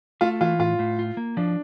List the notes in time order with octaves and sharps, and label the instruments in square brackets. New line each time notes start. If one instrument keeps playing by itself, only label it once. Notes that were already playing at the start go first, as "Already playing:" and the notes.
[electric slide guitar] A3 [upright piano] F4
[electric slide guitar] E3 [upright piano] F4
[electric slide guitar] A2 [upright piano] F4
[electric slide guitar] A2
F4
A#3
[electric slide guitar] F3 [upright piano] D4